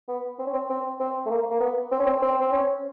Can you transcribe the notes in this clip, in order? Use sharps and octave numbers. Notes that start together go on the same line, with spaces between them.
B3
C4
C#4
C4
C4
C4
A3
A#3
A#3
B3
C4
C#4
C4
C4
C4
C#4